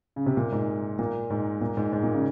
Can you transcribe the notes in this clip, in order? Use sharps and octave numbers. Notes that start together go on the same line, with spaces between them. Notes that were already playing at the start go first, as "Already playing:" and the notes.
C#3
C3
A#2
G#2
A#2
G#2
A#2
G#2
G#2
A#2
C#3